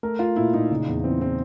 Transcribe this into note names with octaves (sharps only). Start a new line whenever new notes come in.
A3 A#4
A3 F4
A#2 E4
A#2 D#4
C#3
E2
E3 C4
E3 C4